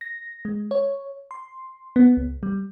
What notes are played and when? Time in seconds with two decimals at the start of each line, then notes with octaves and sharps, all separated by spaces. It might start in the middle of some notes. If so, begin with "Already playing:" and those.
0.01 A#6
0.45 G#3
0.71 C#5
1.31 C6
1.96 B3
2.17 C#2
2.43 G3